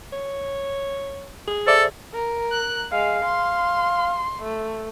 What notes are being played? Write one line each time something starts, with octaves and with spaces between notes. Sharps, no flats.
C#5
G#4
A4 C5 D5 E5
A#4
F#6
G#3 F5
C6
A3